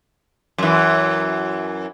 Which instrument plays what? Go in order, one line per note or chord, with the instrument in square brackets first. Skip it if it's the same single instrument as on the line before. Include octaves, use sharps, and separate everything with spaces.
[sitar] F#2 E3